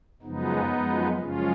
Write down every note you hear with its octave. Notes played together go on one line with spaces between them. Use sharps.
F#2 C#3 F3 G#3 B3 D#4
F#2 F3 G#3
F#2 C#3 F3 G#3 C#4 F4